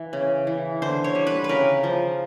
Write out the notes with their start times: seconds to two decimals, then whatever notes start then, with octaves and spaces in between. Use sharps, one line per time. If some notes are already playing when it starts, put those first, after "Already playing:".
Already playing: E3
0.13 C#3
0.47 E3
0.82 D3 C5
1.04 C#5
1.15 G3
1.27 B4
1.44 B4
1.49 C#3 A#4
1.84 F3